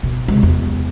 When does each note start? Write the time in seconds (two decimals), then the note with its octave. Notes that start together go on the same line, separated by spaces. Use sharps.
0.03 B2
0.28 C3 G#3
0.43 E2